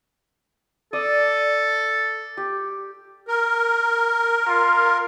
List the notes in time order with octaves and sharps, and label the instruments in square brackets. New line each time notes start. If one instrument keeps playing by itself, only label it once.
[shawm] A4 [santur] D5 D#6
[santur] G4
[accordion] A#4
[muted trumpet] F4